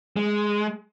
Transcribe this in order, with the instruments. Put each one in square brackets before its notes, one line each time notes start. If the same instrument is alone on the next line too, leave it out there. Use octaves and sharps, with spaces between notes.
[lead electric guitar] G#3